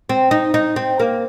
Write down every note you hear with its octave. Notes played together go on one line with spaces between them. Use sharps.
C4
D#4
D#4
C4
A#3